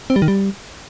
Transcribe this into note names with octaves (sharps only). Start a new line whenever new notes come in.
C4
G3
D#3
G3